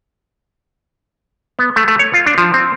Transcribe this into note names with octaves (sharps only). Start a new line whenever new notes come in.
B3
A3
A3
C#5
F4
D4
F3
C4